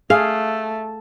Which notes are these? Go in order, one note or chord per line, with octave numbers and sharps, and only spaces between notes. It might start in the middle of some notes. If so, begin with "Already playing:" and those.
A3 G#4 F5